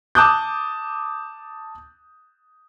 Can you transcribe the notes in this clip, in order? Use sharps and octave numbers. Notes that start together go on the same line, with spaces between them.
A5 D6 D#6 F#6 G6